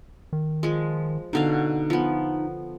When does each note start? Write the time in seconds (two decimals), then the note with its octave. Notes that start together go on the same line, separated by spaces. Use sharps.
0.33 D#3
0.63 F3 G#3
1.33 B2 D3 D#4 F5
1.90 F3 B3